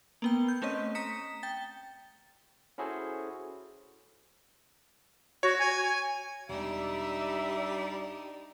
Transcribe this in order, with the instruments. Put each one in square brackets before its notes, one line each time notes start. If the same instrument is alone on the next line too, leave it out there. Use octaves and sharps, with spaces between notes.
[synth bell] A#3 B3 G5
G6
A3 C4 C#4 D#5
A#5 D#6 B6 C#7 E7
G5 A6
[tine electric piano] C#4 E4 F#4 G#4 A4 C5
[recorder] F#4 [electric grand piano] C#5
[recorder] G#5
[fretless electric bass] E1 [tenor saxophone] G3 [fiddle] D4 D#4 [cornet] E5